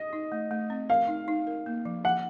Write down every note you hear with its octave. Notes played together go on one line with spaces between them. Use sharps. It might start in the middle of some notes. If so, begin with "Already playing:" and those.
Already playing: D#5
D#4
A3
A3
C4
A#4 F5
D#4
D#4
A#4
A#3
F3
F3 F#5